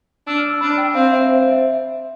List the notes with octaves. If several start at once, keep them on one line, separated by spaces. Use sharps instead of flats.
D4 E6
F6
E6
D4 B5
G5
C4 F5
E5
C5
C5
E5